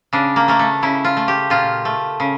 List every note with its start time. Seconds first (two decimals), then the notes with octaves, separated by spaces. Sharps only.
0.13 C#3 D4
0.36 A#3
0.48 A3 A#3
0.59 A3
0.82 C#3 E4
1.04 F4
1.17 A3
1.28 G4
1.50 A#2 F4
1.85 A3
2.20 C#3